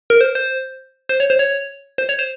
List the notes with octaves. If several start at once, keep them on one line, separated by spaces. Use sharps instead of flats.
A#4
C5
C5
C5
C#5
C5
C#5
C5
C#5
C5